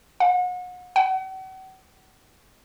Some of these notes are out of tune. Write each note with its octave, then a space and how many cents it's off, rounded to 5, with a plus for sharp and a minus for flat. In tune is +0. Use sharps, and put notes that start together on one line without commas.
F#5 -35
F#5 +40